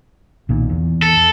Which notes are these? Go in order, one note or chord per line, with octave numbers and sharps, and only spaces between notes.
B1 A#2 D#3
E2
A4